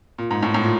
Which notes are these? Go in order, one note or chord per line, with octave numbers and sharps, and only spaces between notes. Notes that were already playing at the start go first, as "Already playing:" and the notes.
A#2
G#2
A2
A2
A#2